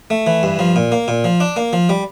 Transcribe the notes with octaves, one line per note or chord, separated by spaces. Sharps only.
A3
E3
G2
F3
A#2
A#3
A#2
F3
D4
A#3
F3
G3